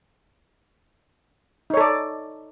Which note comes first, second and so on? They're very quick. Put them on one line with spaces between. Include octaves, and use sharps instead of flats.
D#4 C#5 A4 D5